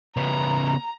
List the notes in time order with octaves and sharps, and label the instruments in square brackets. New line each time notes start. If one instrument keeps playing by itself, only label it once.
[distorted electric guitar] C#3 B3 [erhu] A#5